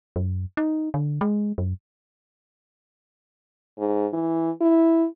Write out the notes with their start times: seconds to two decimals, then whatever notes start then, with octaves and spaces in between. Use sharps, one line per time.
0.16 F#2
0.57 D#4
0.94 D3
1.21 G#3
1.58 F#2
3.78 G#2
4.13 E3
4.61 E4